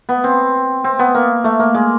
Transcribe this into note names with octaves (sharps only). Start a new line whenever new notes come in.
B3
C4
C4
B3
A#3
A3
A#3
G#3